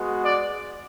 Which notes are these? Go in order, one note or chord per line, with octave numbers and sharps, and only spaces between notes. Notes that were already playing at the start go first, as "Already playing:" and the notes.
Already playing: G#3 B3 F#4
D5